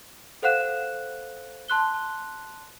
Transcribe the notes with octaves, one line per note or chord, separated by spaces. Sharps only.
A4 C5 F5 F#5 F#6 E7
A5 C6 F#6 G7